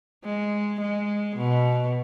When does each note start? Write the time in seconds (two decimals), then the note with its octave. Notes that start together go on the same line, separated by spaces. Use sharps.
0.24 G#3
0.80 G#3
1.37 B2